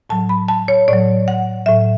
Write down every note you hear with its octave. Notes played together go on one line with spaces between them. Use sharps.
A2 F#3 A5
B5
A5
C#5
A2 F#3 D5
F#5
A2 F#3 E5